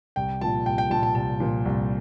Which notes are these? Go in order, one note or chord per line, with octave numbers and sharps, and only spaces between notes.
C2 G5
A#2 F3 A5
C2 G5
G5
A#2 F3 A5
A5
C2 A5
A#2 F3
C2